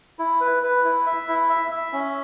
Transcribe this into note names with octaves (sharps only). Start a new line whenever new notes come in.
E4
B4
B4
E4
E5
E4
E5
E5
C#4